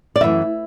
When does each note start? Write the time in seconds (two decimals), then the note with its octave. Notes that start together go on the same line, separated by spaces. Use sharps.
0.16 D5
0.21 F#2 E3 A3 E5